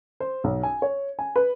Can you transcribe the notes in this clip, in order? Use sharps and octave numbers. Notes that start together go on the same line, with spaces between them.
C5
B1
G#5
C#5
G#5
B4